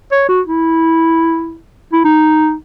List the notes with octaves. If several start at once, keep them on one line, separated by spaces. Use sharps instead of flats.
C#5
F#4
E4
E4
D#4